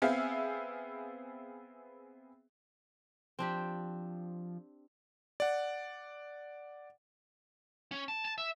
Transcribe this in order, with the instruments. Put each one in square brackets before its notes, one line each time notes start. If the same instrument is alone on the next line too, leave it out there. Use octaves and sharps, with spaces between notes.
[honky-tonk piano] B3 C4 G#4 E5 F5
[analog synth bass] F3 [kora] C4 D4 G4
[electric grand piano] D5 F#5
[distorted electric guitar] C#4
A5
A5
E5